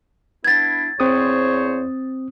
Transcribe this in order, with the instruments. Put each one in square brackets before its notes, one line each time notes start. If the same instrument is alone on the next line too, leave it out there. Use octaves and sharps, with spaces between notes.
[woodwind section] B3 D4 E4 [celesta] G#6 A6
[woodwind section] E2 C5 C#5 [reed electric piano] C4 D#6